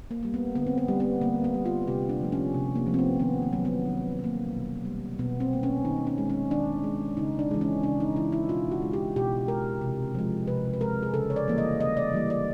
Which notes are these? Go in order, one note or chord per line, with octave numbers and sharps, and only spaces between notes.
A#3
G3 A#3
B3
D3 B3
C4
B3
G3 A#3
B3
D3 A#3
B3
G3 A#3
F4
C3 G4
D4
F3 A3
C#4
C3
A#3
F3 A3
C4
B3
D#3 B3
A#3
F#3 A#3
B3
D#3
F#3 A#3
B2
G3 A#3
B2 B3
C4
G3 A#3
C#4
D#3 D#4
C#4
G#3
C#4
D#3 D4
G#3
C#3 D#4
D4
E3 G#3
C#4
C#3 D4
D#4
E3 G#3 E4
E4
B2 F4
F#4
G#3
G4
B2 G4
G#3 A#4
C3
F3 G#3
C3 B4
B4
F3 G#3 A#4
G#4
C#3 A4
C#5
D5
E3 G3 A#3
D#5
C#3 D#5
D5
E3 G3 A#3
D5